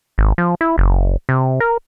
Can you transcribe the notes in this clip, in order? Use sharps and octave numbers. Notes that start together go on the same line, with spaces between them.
G#1
F3
E4
F#1
C3
A#4